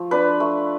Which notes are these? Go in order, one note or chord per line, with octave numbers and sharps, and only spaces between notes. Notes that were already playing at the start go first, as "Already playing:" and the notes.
Already playing: F3 A3
D4 B4
A3